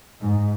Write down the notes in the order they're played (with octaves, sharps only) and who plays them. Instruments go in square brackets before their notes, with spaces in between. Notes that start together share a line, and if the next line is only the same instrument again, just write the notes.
[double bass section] G#2